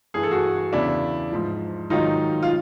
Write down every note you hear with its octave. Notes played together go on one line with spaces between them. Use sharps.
G2 E3 G#4
A4
F#4 G#4
E2 C#3 E3 D4 E4
G#2 F3
G#2 D#3 F#3 D#4 F4
F4